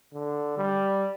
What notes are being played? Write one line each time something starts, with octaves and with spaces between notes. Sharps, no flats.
D3
G3